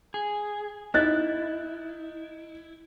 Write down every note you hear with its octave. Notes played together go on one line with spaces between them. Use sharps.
G#4
D#4 E4 F#6 A6